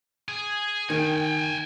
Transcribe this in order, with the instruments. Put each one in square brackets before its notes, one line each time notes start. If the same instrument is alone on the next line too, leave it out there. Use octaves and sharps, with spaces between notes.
[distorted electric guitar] G#4
[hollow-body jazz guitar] D#3 [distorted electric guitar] G5 G#5